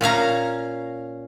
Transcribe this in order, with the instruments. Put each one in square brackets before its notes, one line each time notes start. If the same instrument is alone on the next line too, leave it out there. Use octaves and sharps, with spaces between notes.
[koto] A#2 C#4 F5 A#5